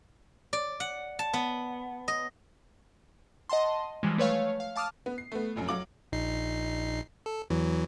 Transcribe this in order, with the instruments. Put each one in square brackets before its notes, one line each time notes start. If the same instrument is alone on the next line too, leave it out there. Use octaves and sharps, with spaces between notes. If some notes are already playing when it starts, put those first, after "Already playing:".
[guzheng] D5
F#5
A5
B3
D#5
[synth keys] D#5 F#5 A5 C6
E3 F3 G3 G#3
A3 B4 C#5 F5
F5
F5 A5 D6 D#6 F6
[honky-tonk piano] B3
C7
A3 B3
F1 A#1 F#2
F#3 F5 D6 F#7
[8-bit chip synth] A#1 D#4 C7
A4
E2 E3 F#3